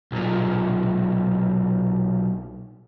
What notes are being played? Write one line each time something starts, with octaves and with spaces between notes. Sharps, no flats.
B1 A#2